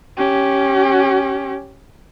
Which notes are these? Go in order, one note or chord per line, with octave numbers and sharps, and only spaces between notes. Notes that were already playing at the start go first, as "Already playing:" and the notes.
C#4 G4